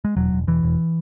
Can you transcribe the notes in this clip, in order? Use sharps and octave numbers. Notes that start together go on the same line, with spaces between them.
G#3
E1 F#3
E1
E1 E3
E1